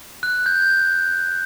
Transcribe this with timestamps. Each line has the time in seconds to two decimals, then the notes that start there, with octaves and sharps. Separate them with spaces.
0.23 F#6
0.46 G6